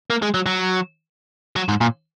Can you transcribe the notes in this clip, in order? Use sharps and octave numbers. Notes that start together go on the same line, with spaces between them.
A#3
G#3
F#3
F#3
F#3
G#2
A#2